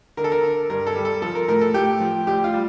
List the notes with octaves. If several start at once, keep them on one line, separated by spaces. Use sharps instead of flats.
D3 A#4
A4
A#4
D3
G2 A#4
A4
G3
A4
F3 A4
A#4
A2 A#4
A4
A2 G4
F3
D2 G4
F4
G3